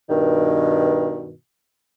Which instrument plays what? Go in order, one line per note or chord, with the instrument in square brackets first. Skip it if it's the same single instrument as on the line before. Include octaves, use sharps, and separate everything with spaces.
[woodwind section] G2 B2 D#3